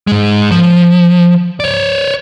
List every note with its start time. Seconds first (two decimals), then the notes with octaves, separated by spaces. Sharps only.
0.07 G#2 G#3
0.51 F3
1.60 C#5 D5